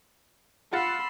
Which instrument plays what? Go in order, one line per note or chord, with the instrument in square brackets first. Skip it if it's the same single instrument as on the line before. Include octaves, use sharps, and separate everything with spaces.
[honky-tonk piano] F4 F#5 A6 [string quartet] B5 C6 E6